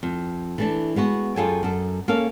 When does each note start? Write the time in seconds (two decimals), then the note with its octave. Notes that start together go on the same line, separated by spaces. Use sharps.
0.03 F2
0.58 E3 A3 D4
0.96 G#3 B3 F#4
1.36 F#2 F4 G#4 A4 G5 G#5
1.63 F#2 A4
2.08 A#3 C#4 A4 C#5 F5